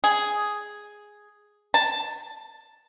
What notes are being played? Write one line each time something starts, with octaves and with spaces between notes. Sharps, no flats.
G#4
A5